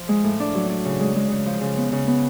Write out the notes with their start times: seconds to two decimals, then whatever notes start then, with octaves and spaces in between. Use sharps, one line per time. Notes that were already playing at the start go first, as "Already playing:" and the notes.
Already playing: F3
0.09 G#3
0.24 A2
0.40 D4
0.54 F#3
0.70 D4
0.85 C#3
1.00 G#3
1.16 G#3
1.31 C#3
1.46 F3
1.61 C#3
1.77 B3
1.92 C#3
2.07 B3